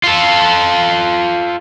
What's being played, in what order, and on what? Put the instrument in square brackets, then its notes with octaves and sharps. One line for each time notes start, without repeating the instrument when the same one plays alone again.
[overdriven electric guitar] F4 A4